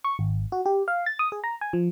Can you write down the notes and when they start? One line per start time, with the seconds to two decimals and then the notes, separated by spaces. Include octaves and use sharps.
0.04 C#6
0.19 G#1
0.52 F#4
0.66 G4
0.88 F5
1.06 A6
1.19 D#6
1.32 G#4
1.44 A#5
1.61 G#5
1.73 F3